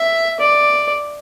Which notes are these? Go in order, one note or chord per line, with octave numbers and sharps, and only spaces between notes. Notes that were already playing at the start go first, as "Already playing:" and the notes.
Already playing: E5
D5